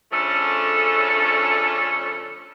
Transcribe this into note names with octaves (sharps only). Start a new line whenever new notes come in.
C#3 F3 A3 C#4 D4 A4